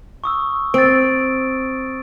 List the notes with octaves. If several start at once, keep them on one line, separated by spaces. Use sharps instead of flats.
C#6 D#6 E6
C4 A6 D7